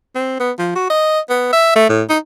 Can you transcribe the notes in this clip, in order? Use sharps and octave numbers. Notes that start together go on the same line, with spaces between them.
C4
B3
F3
F#4
D#5
B3
E5
A3
A2
D#4